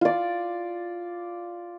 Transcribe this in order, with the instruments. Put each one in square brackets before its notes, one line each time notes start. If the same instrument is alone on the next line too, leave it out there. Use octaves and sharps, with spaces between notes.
[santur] F4 D5